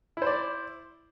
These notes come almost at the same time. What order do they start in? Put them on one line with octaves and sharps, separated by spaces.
E4 C5 D5